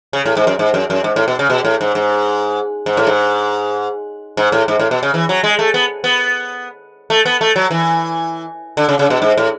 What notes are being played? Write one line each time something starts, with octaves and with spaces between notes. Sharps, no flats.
C#3
A2
G#2
F#2
G#2
F#2
F#2
G#2
A2
B2
C#3
B2
A2
G#2
G#2
G#2
A2
G#2
G#2
A2
G#2
A2
B2
C#3
E3
F#3
G#3
A3
B3
B3
A3
B3
A3
F#3
E3
D3
C#3
C#3
B2
G#2
A2